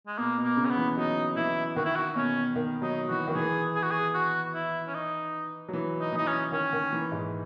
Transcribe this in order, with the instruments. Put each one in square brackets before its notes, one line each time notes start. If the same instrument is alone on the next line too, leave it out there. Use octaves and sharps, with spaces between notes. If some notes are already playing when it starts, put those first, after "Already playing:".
[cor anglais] G#3
[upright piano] B2 [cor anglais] A#3
[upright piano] B2
[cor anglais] A#3
[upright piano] C#3
[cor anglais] C#4
B3
[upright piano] E3
[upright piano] F#3 [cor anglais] D#4
[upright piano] E3 [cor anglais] E4
[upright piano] D#3 [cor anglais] F#4
[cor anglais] E4
F#4
[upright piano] B2 [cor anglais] C#4
[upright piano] D#3
[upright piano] F#3 [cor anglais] D#4
[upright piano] E3 [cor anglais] F#4
[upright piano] D#3
[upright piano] E3 [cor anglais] G#4
[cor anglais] G#4
F#4
G#4
F#4
E4
C#4
D#4
[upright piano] F#3
E3
[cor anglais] D#4
[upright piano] E3 [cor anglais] D#4
[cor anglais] C#4
[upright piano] D#3 [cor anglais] C#4
[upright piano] D#3
E3
G#2